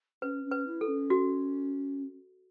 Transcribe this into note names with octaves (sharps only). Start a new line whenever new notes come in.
C#4 B4
C#4
B4
E4
A4
C#4
F#4